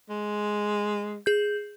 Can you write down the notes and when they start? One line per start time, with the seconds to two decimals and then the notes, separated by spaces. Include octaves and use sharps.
0.09 G#3
1.26 G#4 G6